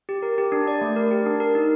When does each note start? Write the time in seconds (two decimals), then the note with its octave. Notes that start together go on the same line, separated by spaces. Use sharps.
0.09 G4
0.22 A#4
0.38 G4
0.52 D4
0.68 D5
0.81 A3
0.96 A#4
1.11 G4
1.26 D4
1.40 A#4
1.55 D#4